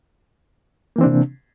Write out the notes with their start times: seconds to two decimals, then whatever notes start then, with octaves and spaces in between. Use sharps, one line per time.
0.96 A#3
0.98 E3
1.01 C4
1.03 D4
1.06 C3